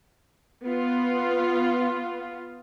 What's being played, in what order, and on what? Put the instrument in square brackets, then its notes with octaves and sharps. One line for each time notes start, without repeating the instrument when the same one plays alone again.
[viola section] B3 F4